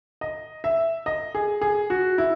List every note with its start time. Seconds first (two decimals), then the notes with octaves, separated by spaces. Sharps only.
0.21 D#5
0.64 E5
1.06 D#5
1.35 G#4
1.61 G#4
1.90 F#4
2.18 E4